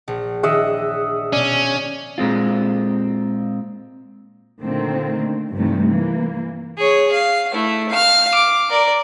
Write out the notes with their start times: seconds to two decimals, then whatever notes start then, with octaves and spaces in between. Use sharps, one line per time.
0.08 A#1
0.43 D#3 D4 E4 G#4 D#5 E5 F#5
1.33 B2 C#4 D4 D5
2.18 A#2 G#3 C4 F4
4.62 A#2 D3 D#3 A3 A#3 C4
5.54 G2 C3 D#3 E3 G3 A3
5.89 E3 A#3
6.78 G#4 C#5
7.13 F5
7.52 A3 E4
7.89 F5 F6
8.34 D6
8.70 A#4 D5